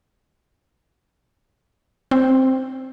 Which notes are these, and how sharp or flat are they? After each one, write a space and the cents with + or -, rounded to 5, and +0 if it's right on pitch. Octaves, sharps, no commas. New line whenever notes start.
C4 +5 C5 +0